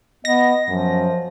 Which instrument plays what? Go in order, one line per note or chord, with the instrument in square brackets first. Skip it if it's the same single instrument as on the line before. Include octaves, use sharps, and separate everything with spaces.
[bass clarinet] B3 [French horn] D#5 [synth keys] A#6
[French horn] F#2 [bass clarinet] F3